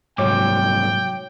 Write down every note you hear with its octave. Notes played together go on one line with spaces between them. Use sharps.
C2 G#2 F#3 C#5 G5 D6